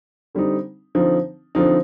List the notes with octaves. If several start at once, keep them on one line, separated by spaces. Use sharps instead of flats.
D3 G3 C4 D#4
D3 F3 C4 D#4
D3 F3 C4 D#4